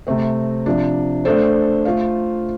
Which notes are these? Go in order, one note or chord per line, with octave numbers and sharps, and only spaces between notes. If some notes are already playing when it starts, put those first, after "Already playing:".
C3 A3 C4
C3 F3 D4
A3 D4 A4 C5
A3 F4 C5 F5